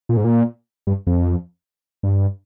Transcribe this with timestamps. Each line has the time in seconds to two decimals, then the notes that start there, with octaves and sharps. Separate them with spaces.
0.09 A#2
0.17 G#2
0.24 A#2
0.87 G2
1.07 F2
2.03 G2